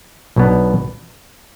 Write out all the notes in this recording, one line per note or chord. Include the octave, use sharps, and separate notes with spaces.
B1 B2 B3 D4